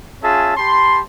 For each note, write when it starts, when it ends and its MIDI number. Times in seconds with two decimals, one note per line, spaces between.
0.22 0.53 61
0.22 0.53 65
0.22 0.53 68
0.22 0.53 76
0.22 0.53 81
0.56 1.00 67
0.56 1.00 81
0.56 1.00 83
0.56 1.00 84